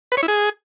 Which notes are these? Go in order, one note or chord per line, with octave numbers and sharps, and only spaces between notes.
B4
C#5
E4
G#4